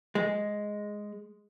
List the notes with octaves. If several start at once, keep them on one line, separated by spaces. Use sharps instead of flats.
G#3